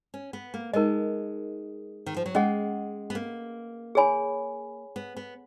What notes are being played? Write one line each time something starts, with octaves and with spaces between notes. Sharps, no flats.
C#4
B3
A#3
G#3 D#4 A#4 D#5
D#3
F3
F#3
G#3 C#4 G#4 D#5 F#5
B3
A#3
G#4 C#5 G#5 B5
B3
B3